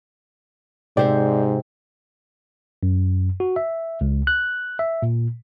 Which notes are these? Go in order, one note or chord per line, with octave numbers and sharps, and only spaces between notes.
G#2 C3 C5 D5 E5
F#2
F#4
E5
C#2
F#6
E5
A#2